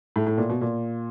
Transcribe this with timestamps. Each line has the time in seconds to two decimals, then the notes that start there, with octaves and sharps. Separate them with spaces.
0.16 A2
0.27 A2
0.38 A#2
0.49 B2
0.61 A#2